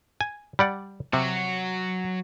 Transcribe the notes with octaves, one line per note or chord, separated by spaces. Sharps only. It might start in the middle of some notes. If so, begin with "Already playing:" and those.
G#5
G3 D5 F#5
C3 F#3 F#4